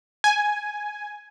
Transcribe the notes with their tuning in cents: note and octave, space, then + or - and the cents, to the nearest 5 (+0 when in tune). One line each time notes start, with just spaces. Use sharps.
G#5 +5